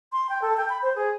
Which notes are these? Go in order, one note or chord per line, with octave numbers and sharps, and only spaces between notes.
C6
G5
A4
G5
B5
C5
G#4